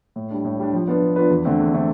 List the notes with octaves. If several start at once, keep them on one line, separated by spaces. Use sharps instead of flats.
A2
G3 D4
A2
G3 D4
F3
B3 D4 F4 B4
F3
B3 D4 F4 B4
E2
D3 A3 C4
E2
D3 A3 C4